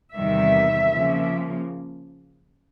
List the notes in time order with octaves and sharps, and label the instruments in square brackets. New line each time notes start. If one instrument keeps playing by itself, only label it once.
[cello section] E2 C3 D#3 G3 E5
C#3 F3 A#3